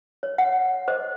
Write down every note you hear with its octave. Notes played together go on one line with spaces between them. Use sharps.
C#5
F#5
C5 D#5